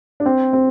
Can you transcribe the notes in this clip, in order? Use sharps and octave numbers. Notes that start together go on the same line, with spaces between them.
D4
C4
C4